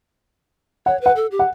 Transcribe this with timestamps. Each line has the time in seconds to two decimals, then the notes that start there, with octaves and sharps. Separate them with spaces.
0.86 C#5 F#5
1.01 B4 F#5
1.16 A4
1.31 G4
1.39 F#5